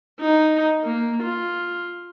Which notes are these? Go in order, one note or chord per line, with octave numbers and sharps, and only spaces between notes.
D#4
A#3
F4